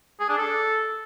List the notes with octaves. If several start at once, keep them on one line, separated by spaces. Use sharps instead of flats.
G#4
D4
A4